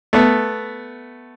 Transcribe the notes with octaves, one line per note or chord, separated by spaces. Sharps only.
A3 B3